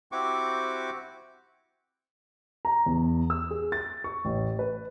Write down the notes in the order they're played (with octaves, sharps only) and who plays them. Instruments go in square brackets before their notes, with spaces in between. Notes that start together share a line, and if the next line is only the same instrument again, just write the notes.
[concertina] C4 E4 F#4 G4 C#6 D6
[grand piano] A#5
E2
E6
G#4
A6
C#6
A1
B4